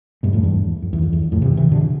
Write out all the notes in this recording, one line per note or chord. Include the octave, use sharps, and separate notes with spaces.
G2 B2
F2 A2
E2 G2
F2
E2
F2
E2
F2 A2
C3 E3
C3 E3
B2 D3